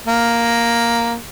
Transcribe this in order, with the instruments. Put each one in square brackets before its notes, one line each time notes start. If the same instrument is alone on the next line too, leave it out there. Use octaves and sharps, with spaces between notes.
[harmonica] A#3